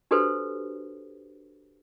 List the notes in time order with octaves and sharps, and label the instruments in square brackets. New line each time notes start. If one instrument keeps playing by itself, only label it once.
[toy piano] D4 F#4 G4 A4 B4 C5